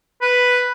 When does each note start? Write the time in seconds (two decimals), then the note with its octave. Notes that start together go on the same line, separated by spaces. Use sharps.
0.22 B4